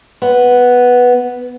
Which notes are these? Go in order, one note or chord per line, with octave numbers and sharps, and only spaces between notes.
B3